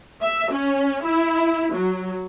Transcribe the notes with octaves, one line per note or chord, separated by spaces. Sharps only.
E5
C#4
E4
F#3